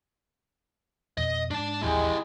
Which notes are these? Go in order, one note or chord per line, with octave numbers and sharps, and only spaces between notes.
F2 B2 D#5
G#2 D4 A5
A1 D#2 F3 G#3 E4 G4